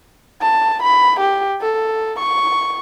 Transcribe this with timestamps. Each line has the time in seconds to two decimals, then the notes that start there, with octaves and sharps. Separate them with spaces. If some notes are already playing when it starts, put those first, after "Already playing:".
0.42 A5
0.83 B5
1.20 G4
1.61 A4
2.19 C#6